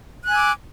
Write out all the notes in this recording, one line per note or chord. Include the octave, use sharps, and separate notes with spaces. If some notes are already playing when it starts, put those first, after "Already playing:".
G#5 D6 E6 F#6